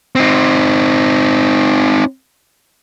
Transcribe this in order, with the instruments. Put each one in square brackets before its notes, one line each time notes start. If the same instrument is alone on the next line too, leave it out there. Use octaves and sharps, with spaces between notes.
[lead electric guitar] C4 D#4